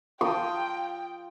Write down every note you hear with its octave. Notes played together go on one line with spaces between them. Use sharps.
F4 G5 A5 A#5 D#6